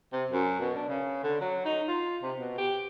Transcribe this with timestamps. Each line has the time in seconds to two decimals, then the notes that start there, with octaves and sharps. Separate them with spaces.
0.13 C3
0.31 F#2
0.60 B2
0.75 D4
0.88 C#3
1.23 D3
1.41 F#3
1.65 D#4
1.88 F4
2.23 C3
2.38 B2
2.58 G4